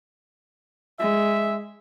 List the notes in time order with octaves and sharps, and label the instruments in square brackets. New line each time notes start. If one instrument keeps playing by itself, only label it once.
[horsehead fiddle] G#3 [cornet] E5